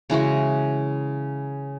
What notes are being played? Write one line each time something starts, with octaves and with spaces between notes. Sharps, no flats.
C#3 E3 G#3 F#4